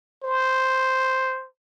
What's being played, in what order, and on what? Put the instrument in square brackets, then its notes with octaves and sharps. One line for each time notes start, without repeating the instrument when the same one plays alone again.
[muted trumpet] C5